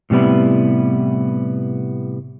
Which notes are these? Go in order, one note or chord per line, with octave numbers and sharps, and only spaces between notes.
A2 C3 G3 B3 E4